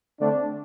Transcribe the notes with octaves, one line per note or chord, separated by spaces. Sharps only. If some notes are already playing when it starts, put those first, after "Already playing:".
D3 A3 C4 D4